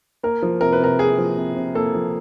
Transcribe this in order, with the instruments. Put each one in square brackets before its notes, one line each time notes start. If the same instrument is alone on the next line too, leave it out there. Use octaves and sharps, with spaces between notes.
[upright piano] A#3 A#4
F3
C3 A#4
B4
C3 A#4
A#3 G#4
F3
C3
C3
A#3 A4
F3